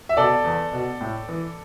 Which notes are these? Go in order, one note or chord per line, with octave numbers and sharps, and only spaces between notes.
E5
B2 A4 D5
E2
B2
A2
E3